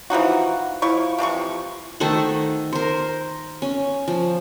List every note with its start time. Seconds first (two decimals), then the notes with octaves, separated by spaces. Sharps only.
0.10 E3 F3 D#4 F#4
0.82 F3 E4 C#6
1.19 C3 E3 F3 C#6
2.00 D#3 A3 C5 F#5
2.72 A#4 C5
3.62 C#4
4.08 F3